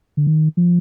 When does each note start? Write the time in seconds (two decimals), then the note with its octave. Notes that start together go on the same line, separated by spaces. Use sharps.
0.17 D3
0.27 D#3
0.57 F3